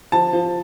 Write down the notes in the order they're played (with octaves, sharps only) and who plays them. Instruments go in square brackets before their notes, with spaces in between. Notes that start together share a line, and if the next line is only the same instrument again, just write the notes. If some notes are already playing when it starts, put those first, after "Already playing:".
[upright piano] F3 A5
F3